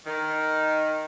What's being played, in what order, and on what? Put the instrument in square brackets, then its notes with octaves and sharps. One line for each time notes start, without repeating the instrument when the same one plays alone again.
[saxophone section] D#3